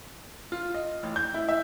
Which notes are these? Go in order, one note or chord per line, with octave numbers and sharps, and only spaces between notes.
F4
D#5
A1
G6
E4
E5